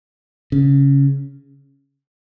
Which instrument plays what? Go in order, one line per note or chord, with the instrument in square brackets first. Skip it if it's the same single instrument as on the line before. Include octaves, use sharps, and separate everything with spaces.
[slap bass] C#3